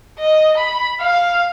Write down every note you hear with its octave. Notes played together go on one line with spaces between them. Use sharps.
D#5
B5
F5